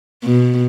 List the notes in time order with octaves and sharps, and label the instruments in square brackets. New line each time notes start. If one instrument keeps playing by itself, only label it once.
[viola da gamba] B2